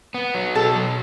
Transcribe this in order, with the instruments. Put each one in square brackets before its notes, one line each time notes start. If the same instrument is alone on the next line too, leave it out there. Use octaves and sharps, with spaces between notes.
[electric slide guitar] B3
F#3
[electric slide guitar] B2 [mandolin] A4
[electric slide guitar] F#3